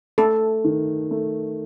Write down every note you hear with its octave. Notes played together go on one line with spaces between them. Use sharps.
A3 A4
D#3
A3